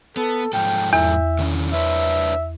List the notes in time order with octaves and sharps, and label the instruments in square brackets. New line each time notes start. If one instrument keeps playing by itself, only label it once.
[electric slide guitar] B3 [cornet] A4
[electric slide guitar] G#2 F3 A4 [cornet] G5
[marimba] E2 [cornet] E5
[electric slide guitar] D3 D#3 C#4
[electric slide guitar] D4 B4 C#5 [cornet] E5